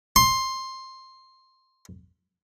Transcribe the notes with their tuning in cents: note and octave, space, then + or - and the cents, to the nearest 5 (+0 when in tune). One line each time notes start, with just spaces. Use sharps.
C6 +10